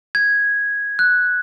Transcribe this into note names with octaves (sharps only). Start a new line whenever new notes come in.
G#6
F#6